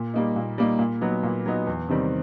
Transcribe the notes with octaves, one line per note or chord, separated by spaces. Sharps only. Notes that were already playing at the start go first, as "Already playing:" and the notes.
Already playing: A#2
G3 A#3 D#4
A#2
G3 A#3 D#4
A#2
F#3 B3 D#4
A#2
F#3 B3 D#4
E2
C3 D#3 G3 C4